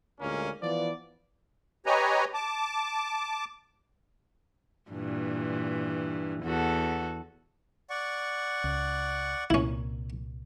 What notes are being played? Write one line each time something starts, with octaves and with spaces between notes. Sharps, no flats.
D2 A#2 G#3 A#3 C#4
E3 F3 B3 D5
G4 B4 C#5 D#5 G#5 A#5
A5 D6
G2 A#2 E3
E2 F#4 A4
D5 F#5 C#6
C#2
C2 A#2 C#4 E4